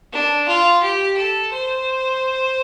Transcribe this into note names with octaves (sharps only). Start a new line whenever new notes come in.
D4
F4
G4
A4
C5